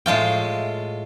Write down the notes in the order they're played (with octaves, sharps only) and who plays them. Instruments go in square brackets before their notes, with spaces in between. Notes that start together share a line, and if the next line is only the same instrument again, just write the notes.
[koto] A2 G#3 F4 G5